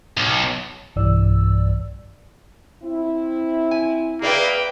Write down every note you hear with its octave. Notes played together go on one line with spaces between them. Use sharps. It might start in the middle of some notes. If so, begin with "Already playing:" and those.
B1
B1 G2 E3 G3 D5 E6
C4 E4
G#5
A#3 G#4 B4 D5 E5 G5